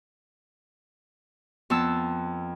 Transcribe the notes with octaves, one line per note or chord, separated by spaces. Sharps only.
F2 B3 A5 E6